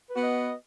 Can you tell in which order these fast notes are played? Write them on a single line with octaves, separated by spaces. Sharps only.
B4 F#4 B3 D#5